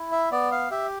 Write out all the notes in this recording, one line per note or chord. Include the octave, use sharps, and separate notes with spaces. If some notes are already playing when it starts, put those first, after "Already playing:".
Already playing: E4
E5
B3 D5
F5
G4 E5